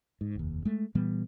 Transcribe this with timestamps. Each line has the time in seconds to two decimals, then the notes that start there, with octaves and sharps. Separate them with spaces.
0.21 G#2
0.35 F1 D#2
0.65 G#3 A3
0.95 A#2 E3 G3 B3